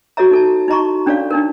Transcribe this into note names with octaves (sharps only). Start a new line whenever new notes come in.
F#4 A4 C#5 E5 A#5
D#4 A4 A5
D#4 E4 D#5 A#5 C6 C#6
C#4 D4 A4 C#5 D5 F5
D4 D#4 A#4